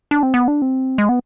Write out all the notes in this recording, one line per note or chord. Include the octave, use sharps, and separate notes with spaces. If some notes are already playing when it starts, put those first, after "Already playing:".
D4
C4
B3
D4
C4
G#3
B3